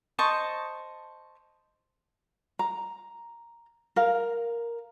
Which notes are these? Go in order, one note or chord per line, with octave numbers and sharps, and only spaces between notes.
C5 D#5 A5 C#6
A#5
A#4 F5